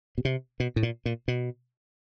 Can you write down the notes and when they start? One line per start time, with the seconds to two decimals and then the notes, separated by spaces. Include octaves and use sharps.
0.18 B2
0.25 C3
0.60 B2
0.76 A2
0.83 A#2
1.06 A#2
1.28 B2